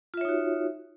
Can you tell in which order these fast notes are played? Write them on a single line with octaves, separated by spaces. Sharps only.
F4 E5 C#5 D#4 F#4